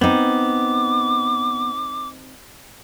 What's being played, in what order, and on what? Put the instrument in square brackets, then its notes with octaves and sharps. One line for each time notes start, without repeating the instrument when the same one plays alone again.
[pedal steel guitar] B3 [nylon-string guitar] C4 D#4 [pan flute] D6